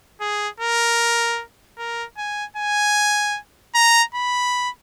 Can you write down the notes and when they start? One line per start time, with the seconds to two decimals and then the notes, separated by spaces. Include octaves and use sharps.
0.21 G#4
0.60 A#4
1.78 A#4
2.17 G#5
2.57 G#5
3.75 A#5
4.14 B5